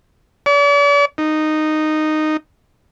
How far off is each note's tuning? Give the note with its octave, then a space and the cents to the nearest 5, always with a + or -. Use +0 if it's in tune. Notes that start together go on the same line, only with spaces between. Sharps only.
D5 -45
D#4 -10